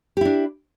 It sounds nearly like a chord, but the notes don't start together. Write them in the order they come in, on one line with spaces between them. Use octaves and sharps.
G4 E4 D4